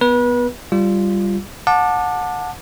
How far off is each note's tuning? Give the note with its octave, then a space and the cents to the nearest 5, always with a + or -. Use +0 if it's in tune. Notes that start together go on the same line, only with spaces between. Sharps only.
B3 +0 B4 -30
G3 +0 F4 -10
F#5 -30 A5 +0 D6 +20